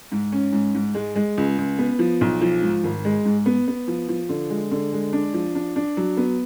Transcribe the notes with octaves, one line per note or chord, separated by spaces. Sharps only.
G#2
C#4
G#2
G#2
G#3
G#3
C#2
C#2
B3
F3
B1
F3
G#2
G#1
G#3
G#2
B3
B3
F3
F3
D3
G#3
D3
G#3
D4
F3
D4
D4
F#3
B3